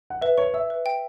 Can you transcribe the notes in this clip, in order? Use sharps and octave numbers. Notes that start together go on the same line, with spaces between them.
F#5
B4 E5
C#5 C#6
E5 E6
B4
G5